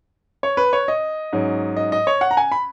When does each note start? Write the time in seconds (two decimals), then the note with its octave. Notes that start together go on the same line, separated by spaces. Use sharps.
0.43 C#5
0.57 B4
0.73 C#5
0.88 D#5
1.33 G#2 F#3 C#4
1.77 D#5
1.92 D#5
2.07 C#5
2.21 F#5
2.31 A#5
2.37 G#5
2.52 B5